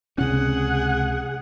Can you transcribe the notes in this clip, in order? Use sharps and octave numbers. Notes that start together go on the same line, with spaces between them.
C#2 C3 C#4 G#4 F#5